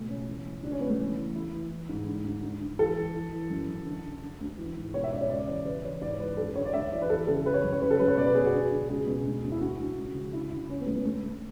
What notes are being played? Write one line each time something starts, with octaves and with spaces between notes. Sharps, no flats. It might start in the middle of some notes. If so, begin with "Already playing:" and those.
Already playing: B2 A3
C#2 C#4
E3
E3
C#2 D4
C#4
C#2 B3
A3
E3
E3
E3 E4
E3
E3
G#2
D3
D2
D3
D3
E3 A4
E3
E3
E3
F#2
F#2
D3
D3
D3
D2
E3
G#2
B2 C#5
E5
C#2 D5
C#5
C#3 D5
E2 D5
C#3 B4
E3 C#5
G#2 D5
E3 B4
F#2 A4
D3 C#5
D5
D2 E5
E3 D5
B4
E2 A4
C#3 A4
E3 B4
C#5
F#2
C#5
C#3 B4
A4
F#2 B4
C#5
B2 D5
B4
B2 G#4
F#4
D3 G#4
D3
C#2 G#4
B2
D2
D2
E4
D2 F#4
D2
C#2
C#3
D3 E4
D3 E4
C#2 C#4
B3
C#2 A3
B3
D2 A3
D3